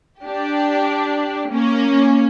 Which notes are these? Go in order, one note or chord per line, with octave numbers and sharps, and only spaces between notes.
D4 G4
A#3 C#4